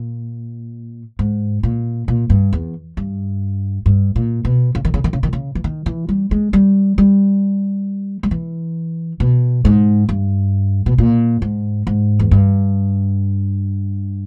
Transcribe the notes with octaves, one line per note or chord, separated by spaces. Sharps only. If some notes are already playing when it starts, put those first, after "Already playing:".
Already playing: A#2
G#2
A#2
A#2
G2
E2
G2
G2
A#2
B2
C#3
D#3
C#3
D#3
C#3
D#3
C#3
E3
D#3
E3
G3
G#3
G3
G3
G3
E3
B2
G#2
G2
B2
A#2
G#2
G#2
E2
G2